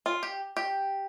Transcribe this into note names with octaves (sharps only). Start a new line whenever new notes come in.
F4
G4
G4